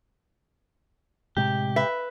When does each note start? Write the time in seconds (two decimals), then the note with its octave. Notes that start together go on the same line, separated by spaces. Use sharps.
1.37 A2 C3 G#3 G4
1.76 B4 E5